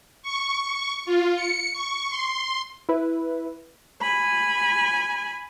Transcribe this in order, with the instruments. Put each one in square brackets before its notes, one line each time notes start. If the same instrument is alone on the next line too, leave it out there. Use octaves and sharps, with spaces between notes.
[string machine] C#6
F4
C#7
C#6
C6
[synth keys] E4 B4
[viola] G#5 B5